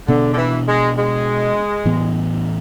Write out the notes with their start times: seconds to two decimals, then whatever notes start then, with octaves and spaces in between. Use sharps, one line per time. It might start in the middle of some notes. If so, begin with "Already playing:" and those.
0.07 B2 D3 B3 D4
0.32 D3
0.37 E3
0.67 G#3
0.97 G#3
1.85 A2 E3 B3